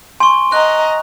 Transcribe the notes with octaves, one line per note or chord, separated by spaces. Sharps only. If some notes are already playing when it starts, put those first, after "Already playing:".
G#5 C6 C#6
D#5 A#5 F#6